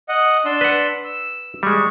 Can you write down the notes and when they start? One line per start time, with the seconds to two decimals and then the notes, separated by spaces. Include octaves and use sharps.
0.09 D#5 F#5
0.45 D4 C6 E6
0.61 B4 F#5
1.05 E6
1.63 G3 G#3 C#6